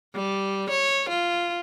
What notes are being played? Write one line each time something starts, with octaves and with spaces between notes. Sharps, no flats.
G3
C#5
F4